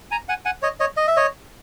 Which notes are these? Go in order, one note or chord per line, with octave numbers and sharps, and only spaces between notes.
G#5 A#5
F#5 G#5
F#5 G#5
C#5 D#5
C#5 D#5
D#5
E5
C#5 D#5